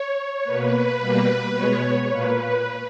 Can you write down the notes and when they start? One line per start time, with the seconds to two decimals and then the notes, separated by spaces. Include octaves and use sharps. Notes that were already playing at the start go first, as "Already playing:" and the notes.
Already playing: C#5
0.44 B2 A#3 B4
1.00 B2 G3 A#3
1.54 B2 G#3 B3 C#5
2.09 A#2 A#3 B4